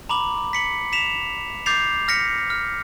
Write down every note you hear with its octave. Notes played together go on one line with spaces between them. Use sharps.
A#5 B5 D6 F#7
B6 C#7 F#7
B6 E7 F7
D6 G6 A6 C7 F7
F6 A#6 B6 C#7
F6